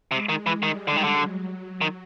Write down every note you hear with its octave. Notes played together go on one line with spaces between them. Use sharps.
C3 G#3
D#3
E3
D#3 G3
D3
D#3
D3
F#3
D#3